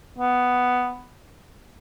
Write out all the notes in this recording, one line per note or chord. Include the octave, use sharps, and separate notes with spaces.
B3